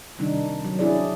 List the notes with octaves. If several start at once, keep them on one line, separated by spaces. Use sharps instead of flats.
C3 D#3 G3 D4 D#4
F#3
D4 E4 G#4 D5